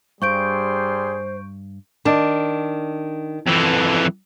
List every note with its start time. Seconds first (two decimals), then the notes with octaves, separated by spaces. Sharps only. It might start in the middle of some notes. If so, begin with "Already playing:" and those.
0.22 G2 G3 G#4 C5 C6 C#6 G6 D7
2.05 D#3 D4
3.47 F2 E3